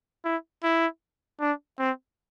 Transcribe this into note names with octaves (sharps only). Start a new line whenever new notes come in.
E4
E4
D4
C4